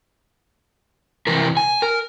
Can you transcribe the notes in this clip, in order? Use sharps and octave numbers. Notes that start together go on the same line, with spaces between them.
C3 E3 A#4
G#5
A#4